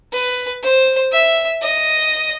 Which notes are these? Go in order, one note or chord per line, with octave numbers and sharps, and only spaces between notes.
B4
C5
E5
D#5